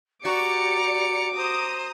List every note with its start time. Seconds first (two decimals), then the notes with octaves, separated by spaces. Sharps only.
0.25 F#4 G4 D5 A#5 D6 C#7
1.37 C5 A#5 D#6